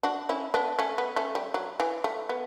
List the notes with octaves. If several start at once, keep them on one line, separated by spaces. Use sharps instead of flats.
D4 F#4
C#4 E4
B3 D4
A3 C#4
B3
A3 C#4
G3
F#3
E3
A3
B3